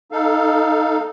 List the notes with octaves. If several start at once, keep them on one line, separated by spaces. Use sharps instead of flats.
D#4 A4 F5